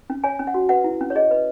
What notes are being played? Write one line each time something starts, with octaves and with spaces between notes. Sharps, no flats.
C#4
C#5 G#5
C#4
F#5
F#4
B4 F#5
E4
C#4
C#5
G#4 D#5
B4